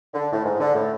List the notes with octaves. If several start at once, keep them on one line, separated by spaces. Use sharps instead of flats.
D3
A2
G#2
D3
A2